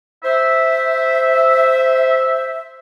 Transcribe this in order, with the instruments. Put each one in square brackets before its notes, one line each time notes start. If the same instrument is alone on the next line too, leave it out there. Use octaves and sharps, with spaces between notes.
[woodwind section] C5 E5